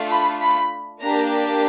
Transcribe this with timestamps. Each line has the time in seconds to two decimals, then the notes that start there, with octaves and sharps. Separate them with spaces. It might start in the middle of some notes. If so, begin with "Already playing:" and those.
Already playing: A3 D4 F4
0.10 B5
0.41 B5
1.01 A#3 D4 G4 A#5